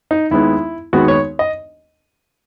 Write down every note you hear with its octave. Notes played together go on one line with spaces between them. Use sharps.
D#4
D#2 D#3 G#3 B3 E4
D#2 D#3 G#3 B3 F#4
C#5
D#5